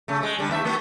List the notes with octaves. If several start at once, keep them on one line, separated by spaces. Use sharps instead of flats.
C#3 A3
G#3 A3
D3 G3
D#2 A3 E5
A3 F#4